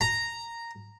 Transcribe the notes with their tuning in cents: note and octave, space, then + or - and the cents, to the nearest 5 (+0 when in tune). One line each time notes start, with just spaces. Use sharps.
A#5 -5